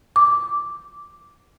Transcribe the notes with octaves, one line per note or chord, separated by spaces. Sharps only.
D6